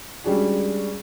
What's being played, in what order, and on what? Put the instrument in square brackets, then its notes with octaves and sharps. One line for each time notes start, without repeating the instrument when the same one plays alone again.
[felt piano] G3 G#3 C#4 D4 F#4 G#4